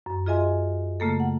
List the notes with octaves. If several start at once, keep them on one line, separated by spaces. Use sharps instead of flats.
F#2
F4 G#4 D#5 E5 G#5 C6
C#3 A3 A#3 A4
F#5